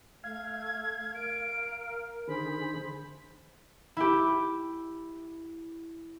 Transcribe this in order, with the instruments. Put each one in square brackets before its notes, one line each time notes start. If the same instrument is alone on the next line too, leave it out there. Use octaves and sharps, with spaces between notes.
[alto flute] A3 [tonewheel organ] F5 [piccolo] G#6
[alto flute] A#4 [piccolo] D7
[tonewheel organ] D3 D#3 G#4 [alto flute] C5 [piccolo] B5
[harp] E4 G4